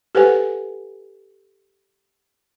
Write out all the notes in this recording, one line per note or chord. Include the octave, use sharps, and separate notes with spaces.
G4 A4 B4 C5 F#5 G#5